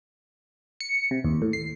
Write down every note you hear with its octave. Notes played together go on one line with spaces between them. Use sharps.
C#7
C3
D#2
A2
C7